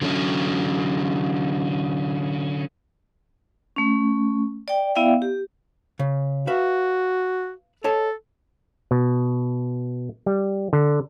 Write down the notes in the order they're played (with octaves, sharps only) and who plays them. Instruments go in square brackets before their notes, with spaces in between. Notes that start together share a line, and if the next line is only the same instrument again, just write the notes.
[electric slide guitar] D3 F#3 C#4
[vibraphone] A3 C#4
D5 G5
B3 E4 D5 E5 F5 G5
G4
[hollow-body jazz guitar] C#3
[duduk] F#4 [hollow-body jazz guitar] B4 E5 F5
[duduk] A4 [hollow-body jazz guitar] C#5 D#5 A5
[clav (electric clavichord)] B2
G3
D3